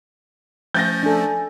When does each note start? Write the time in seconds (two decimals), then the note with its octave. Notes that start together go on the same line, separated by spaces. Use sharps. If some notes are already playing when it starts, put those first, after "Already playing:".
0.74 F3 A3 C#4 G6 A6 A#6
1.03 D4 A4 G#5